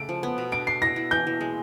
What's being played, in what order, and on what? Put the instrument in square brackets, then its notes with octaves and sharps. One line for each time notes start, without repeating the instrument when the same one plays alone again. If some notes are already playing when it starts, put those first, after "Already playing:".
Already playing: [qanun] C#3 A3 [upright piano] D7
[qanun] F3
B3
B2
[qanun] D4 [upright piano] D7
[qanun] D4 [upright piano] C7
[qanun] E4 [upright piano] A#6
[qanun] E4
[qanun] E3 [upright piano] G6
[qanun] E3
G#3